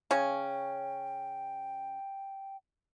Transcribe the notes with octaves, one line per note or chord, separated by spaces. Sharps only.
C#3 C#4 G5